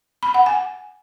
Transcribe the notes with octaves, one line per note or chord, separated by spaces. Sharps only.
B5
F#5
G#5